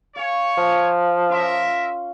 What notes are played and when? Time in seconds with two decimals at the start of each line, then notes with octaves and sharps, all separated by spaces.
0.16 C#5 F5 G#5
0.58 F3 F5
1.29 C#4 F4 A#4 E5 C6